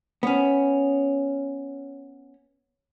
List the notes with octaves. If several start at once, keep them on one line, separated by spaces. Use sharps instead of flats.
B3 C#4